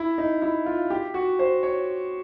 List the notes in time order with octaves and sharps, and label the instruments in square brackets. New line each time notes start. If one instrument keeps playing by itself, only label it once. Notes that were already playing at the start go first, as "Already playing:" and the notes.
Already playing: [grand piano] E4
D#4
E4
F4
G4
F#4
C5
C#5